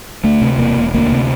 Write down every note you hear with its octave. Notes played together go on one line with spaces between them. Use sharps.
D2 A3
C3
E1 A#3
E1
D2 A#3
C3